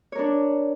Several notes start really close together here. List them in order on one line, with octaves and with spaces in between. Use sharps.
C#5 A#4 D4